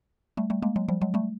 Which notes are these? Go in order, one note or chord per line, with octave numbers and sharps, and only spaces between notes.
G3 A3
G3 A3
G#3 A#3
F#3 G#3
F3 G3
F#3 G#3
G3 A3